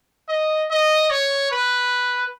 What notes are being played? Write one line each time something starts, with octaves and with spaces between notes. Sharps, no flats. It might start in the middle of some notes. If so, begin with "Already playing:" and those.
D#5
D#5
C#5
B4